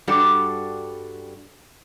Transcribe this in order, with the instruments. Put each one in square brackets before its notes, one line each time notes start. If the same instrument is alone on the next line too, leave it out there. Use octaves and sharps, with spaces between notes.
[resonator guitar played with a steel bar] G2 G3 D4 F#4 A4 D5